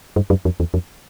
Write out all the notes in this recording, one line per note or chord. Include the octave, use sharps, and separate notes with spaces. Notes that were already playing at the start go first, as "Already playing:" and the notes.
G2
F#2
F2
E2
F2